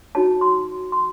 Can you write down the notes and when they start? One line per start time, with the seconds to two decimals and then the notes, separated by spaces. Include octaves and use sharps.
0.15 D#4 F#4 C#5 A5
0.41 C6
0.92 C6